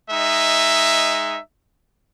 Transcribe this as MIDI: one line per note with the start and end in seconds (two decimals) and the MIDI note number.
0.11 1.39 56
0.11 1.39 63
0.11 1.39 76